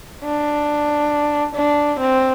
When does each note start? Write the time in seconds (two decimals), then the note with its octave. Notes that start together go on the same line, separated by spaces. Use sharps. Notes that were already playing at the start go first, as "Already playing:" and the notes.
0.25 D4
1.55 D4
2.00 C4